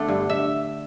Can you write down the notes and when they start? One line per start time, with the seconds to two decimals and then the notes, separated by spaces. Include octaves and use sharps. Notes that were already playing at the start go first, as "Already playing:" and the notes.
Already playing: D3 A3 B3 D4
0.08 G2
0.30 E5